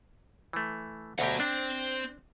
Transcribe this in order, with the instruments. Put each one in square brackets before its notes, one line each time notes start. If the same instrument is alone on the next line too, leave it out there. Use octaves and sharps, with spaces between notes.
[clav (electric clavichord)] E3 A3
[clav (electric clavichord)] D2 B2 G4 [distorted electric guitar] F#5 A#5
[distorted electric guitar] C4 [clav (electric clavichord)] D4